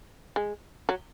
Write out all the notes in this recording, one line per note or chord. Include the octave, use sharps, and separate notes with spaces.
G#3
F#3